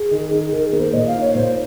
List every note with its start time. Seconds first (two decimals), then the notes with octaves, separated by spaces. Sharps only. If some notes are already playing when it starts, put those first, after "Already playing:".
Already playing: G#4
0.11 D#3
0.31 D#4
0.52 D#3 A#4
0.66 G#4
0.73 A#3
0.80 C5
0.93 A#2 D#5
1.07 F5
1.15 D#4
1.21 C#5
1.35 A#2 C5